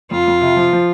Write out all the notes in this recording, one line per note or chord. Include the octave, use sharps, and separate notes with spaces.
F2 F4
F2
C3
F3
F3